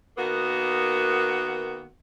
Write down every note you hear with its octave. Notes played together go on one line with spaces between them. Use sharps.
D#3 A#3 B3 F#4